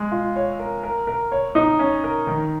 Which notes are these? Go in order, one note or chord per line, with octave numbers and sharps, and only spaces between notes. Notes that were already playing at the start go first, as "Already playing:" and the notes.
Already playing: G#3
F4
C#5
A#4
A#4
A#4
C#5
D#4
C#4
A#4
D#3